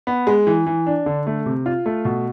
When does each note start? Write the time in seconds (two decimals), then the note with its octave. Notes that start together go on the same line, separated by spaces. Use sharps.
0.07 B3
0.27 G#3
0.47 E3
0.66 E3
0.87 D4
1.06 D3
1.27 A3
1.46 C3
1.66 F4
1.86 A3
2.05 B2